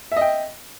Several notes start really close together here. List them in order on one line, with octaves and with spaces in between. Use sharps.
E5 D#5 G5